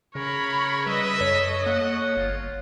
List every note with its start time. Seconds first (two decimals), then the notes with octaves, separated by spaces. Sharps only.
0.15 C#3 A#4 C#5 B5
0.86 G3 B4 D#5 E5
1.21 F#2 A4 C#5 D#5
1.66 A#3 F#5
2.17 G1 F4